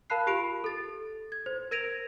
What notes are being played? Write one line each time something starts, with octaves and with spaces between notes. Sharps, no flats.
A#4 F5 A5 B5 F#6 C7
F4 G4 B5 D7 F7
A4 A6
G#6
C5
A#4 G#6 A#6 D7 D#7 F7